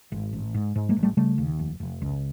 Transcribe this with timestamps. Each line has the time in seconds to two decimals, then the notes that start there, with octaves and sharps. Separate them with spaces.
0.12 G#1
0.33 A1
0.54 G#2
0.76 G#2
0.89 G#3 A#3
0.97 A1
1.03 G3 A3
1.17 C#3 G3 A3
1.38 D#2
1.59 F1
1.80 F1
2.02 C#2